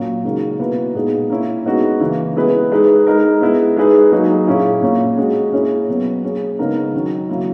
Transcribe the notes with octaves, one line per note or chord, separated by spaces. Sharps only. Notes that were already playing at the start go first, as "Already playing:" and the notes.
Already playing: A#2 F#3 A#3 C#4
C#3 G#3 D#4 F#4 A#4
B2 A#3 E4 B4
A#2 G#3 B3 D#4 G#4
A#3 C#4 E4
G#3 B3 D#4 F#4
C#3 E3 A#3 E4
G#3 B3 E4 G#4 B4
G#3 D#4 G#4 B4
G#3 D#4 A#4
G#3 B3 E4
G#3 D#4 G#4 B4
F#3 A#3 D#4 G#4
A#2 A#3 C#4 E4 G#4
A#2 A#3 C#4
G#3 C#4 F#4
A#3 C#4 E4 G#4 C#5
B2 F#3 B3
A#3 C#4 G#4
C#3 G#3 B3 D#4 A#4
D#3 F#3 C#4
C#3 F#3 A#3 E4